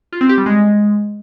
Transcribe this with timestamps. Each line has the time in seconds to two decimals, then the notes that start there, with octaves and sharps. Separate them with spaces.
0.12 F4
0.21 C4
0.29 G4
0.38 G3
0.46 G#3